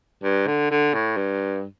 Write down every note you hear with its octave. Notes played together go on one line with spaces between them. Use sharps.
G2
D3
D3
A2
G2